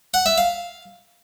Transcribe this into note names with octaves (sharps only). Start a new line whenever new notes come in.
F#5
E5
F5